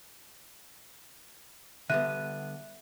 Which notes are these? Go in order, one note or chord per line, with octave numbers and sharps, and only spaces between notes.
D3 G3 B3 E5 F#6 D#7